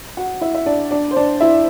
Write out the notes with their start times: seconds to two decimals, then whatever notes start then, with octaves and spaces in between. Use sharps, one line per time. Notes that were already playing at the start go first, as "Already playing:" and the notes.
0.17 F#4 F#5
0.41 E4 E5
0.55 E5
0.66 D4 D5
0.91 D4 D5
1.11 C5
1.16 D4 D5
1.41 E4 E5